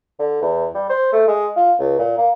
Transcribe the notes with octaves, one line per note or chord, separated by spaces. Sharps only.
D3
E2
G3
C5
A3
G#3
F4
C#2
A#2
A#3